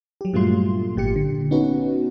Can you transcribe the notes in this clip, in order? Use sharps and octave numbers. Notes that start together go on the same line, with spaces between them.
F#3 G4
G2 A#2 F#3 A3 F4 C6
G#1 A#2 G4 C#7
D3
B3 C#4 D#4 F#4 B4